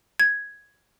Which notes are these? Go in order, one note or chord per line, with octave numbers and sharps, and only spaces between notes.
G#6